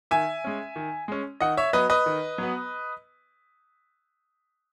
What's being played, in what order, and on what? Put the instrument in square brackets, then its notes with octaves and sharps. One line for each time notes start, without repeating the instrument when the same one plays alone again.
[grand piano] D#3 E5 G#5
G#3 C#4
D#3
G#3 C#4
D#3 D#5 F#5
C#5 E5
F#3 B3 B4 D#5
B4 D#5
D#3
F#3 B3